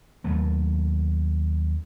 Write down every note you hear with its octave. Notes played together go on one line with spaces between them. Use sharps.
D#2 F#3 A3